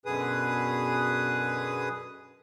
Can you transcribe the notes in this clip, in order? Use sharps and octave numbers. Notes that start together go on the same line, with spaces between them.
F#2 B2 D3 G#4 B4 D#6